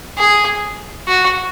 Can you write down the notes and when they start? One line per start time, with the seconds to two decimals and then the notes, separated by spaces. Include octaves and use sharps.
0.18 G#4
1.08 F#4